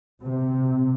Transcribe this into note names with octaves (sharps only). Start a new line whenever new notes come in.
C3